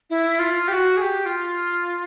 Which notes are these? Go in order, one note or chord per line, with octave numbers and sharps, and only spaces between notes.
E4
F4
G4
F#4
G#4
G4
F4